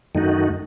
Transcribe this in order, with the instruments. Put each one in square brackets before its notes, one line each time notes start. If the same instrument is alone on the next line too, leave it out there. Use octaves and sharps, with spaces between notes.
[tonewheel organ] F#2 D#3 A3 D#4 F#4